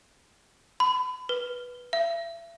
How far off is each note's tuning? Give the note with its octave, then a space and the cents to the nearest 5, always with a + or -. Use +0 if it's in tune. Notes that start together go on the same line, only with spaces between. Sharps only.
B5 +35
B4 -10
E5 +35